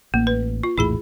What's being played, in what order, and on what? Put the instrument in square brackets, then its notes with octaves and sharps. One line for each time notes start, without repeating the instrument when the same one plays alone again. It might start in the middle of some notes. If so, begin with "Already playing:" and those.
[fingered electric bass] A1 [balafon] A#3
[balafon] B4
F4
[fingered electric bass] A#1 E2 A2 [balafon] E4 G#4 B5